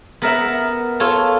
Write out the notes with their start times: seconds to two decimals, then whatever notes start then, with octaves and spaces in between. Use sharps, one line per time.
0.22 B3 A#4 E5 F#5
1.00 F4 A4 C#5